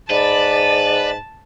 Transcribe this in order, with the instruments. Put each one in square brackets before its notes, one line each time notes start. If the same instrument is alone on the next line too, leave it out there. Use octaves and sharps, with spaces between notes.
[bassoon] G#2 [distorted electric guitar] B4 [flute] D5 [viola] A5